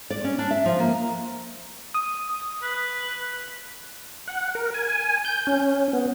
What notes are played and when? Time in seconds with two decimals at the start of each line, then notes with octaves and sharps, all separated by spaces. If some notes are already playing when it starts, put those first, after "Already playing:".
0.10 D5
0.24 C#4
0.38 D4
0.51 E5
0.65 F3
0.80 A#3
1.94 D#6
2.62 B4
4.28 F#5
4.55 A#4
4.74 G#5
5.25 G6
5.47 C#4
5.93 B3